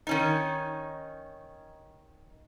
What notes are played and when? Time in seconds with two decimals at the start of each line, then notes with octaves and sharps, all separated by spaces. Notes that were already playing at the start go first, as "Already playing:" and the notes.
0.07 D#3 C#4 D#4